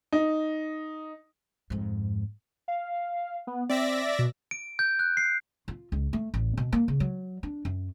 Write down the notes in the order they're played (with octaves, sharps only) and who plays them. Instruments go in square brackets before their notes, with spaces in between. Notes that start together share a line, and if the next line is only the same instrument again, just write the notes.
[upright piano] D#4
[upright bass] F2 G#2
[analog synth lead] F5
B3
[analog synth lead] C4 [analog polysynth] D5 E5 A#6
[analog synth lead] B2
[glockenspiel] D7
G6
F#6
C7
[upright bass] F4
C#2
A3
A1
B2
A#3
C#3
F#3
D4
F#2